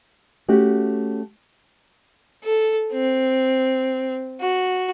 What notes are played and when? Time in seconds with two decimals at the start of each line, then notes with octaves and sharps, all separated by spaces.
0.48 A3 C#4 F#4 G4
2.43 A4
2.92 C4
4.42 F#4